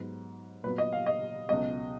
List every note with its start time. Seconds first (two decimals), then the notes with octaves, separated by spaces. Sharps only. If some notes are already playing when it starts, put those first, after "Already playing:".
Already playing: G#2 F#3 B3
0.64 A#2 F#3 B3 B4
0.78 D#5
0.93 F5
1.06 D#5
1.49 C#2 B2 F#3 B3 D#5